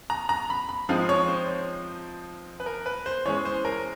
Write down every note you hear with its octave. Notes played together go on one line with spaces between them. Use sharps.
A#5
A#5
B5
B5
F3 G#3 C4 D#4 F5
C#5
C5
B4
A#4
B4
C5
E3 G#3 C#4 C#5
C5
A#4